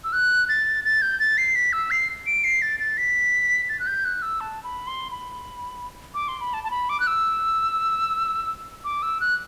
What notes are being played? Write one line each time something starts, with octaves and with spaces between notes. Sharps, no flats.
E6
F#6
A6
A6
G6
A6
C7
B6
E6
C7
D7
C7
A6
A6
B6
A6
F#6
G6
F#6
E6
A5
B5
C6
B5
D6
C6
B5
A5
A5
B5
D6
F#6
E6
D6
E6
F#6